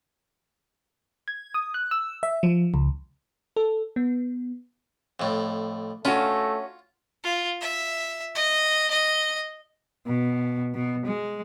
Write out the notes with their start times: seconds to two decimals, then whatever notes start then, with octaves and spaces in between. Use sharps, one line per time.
1.28 G#6
1.54 D#6
1.74 F#6
1.91 E6
2.23 E5
2.43 F3
2.74 C#2
3.56 A4
3.96 B3
5.20 F2 A2
6.05 A3 C#4 F4 F#4
7.24 F4
7.61 E5
8.35 D#5
8.91 D#5
10.07 B2
10.74 B2
11.05 G#3